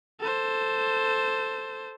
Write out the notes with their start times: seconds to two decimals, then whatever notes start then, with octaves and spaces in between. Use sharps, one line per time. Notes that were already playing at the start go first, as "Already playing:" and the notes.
0.20 A4 C5